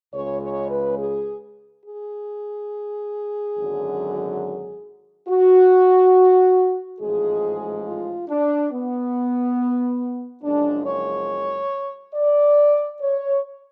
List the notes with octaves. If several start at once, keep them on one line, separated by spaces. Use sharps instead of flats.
C#2 C#3 G#3 C#5
C#5
B4
G#4
G#4
G#1 F#2 D3 F#3
F#4
A1 G#2 F3 G#3 G#4
F4
D4
B3
F#1 F#2 F3 G#3 D4
C#5
D5
C#5